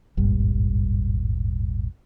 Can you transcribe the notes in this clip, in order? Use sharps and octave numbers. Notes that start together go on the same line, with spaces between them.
D#1 G#1 G2